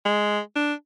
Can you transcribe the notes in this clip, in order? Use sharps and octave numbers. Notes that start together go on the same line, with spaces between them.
G#3
D4